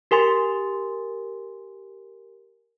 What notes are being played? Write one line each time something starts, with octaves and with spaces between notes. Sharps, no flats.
G4 A#4 G#5 C6 A6